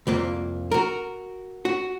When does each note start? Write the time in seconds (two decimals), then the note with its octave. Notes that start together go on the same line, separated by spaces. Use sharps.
0.07 C2 F2 A#3
0.71 F#4 A#4
1.65 F#4